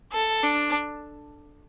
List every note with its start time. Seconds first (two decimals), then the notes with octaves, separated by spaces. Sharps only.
0.12 A4
0.43 D4